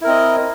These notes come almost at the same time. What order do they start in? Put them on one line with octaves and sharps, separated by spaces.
E4 A#4 C4 D#5